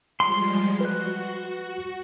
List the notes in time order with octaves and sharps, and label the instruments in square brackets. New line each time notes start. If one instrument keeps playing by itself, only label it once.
[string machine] F3 G3 G#3 [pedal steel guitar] C6
[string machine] F#4 [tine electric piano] B4 F#6